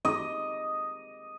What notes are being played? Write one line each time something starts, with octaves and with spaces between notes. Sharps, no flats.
D#5